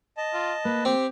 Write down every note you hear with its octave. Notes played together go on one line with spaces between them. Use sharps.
D#5 A5
F4
A#3 B4
C4 G4